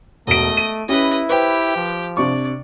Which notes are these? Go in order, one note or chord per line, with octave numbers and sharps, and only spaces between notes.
E1 A3 D#5 D7
D#7
C#4 E4 G4 B4 D#5
G4 B4 C5 G5
F3
C3 D4 D5 C#6